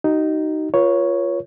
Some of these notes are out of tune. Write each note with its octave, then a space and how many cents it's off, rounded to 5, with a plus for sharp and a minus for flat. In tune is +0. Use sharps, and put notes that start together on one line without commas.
D#4 +0 F#4 +45
F4 +0 A#4 +45 C#5 +0